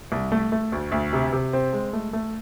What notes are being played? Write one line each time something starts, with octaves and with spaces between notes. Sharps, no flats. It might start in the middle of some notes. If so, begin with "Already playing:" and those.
C2
A3
A3
D2
D2
C3
C3
C4
G#3
A3
A3